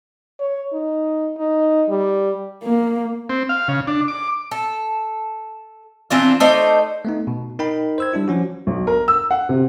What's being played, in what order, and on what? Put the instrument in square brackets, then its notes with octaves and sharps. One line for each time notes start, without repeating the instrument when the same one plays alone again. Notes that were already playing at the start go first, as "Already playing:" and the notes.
[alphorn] C#5
D#4
D#4
G3
[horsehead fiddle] A#3
[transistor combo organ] C4
F5
C#3
D4
D6
[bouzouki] A4
E3 C4 D4 F4
A3 D#4 C5 D5
[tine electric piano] A3 B3 D#4
B2
D#4 A#4 G5 B5
C5 E6 G#6
G3 D4 E4
F3 C#4 F#4
[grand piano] B1
A#4
E6
F#5
C3